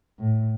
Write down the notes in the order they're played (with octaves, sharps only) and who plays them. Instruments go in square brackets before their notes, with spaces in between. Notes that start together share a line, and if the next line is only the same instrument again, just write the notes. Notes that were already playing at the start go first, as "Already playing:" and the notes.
[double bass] A2